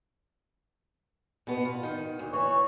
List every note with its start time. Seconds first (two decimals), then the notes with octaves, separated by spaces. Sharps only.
1.47 B2 B3
1.65 F4
1.83 D#3
2.19 D2
2.33 E3 C#5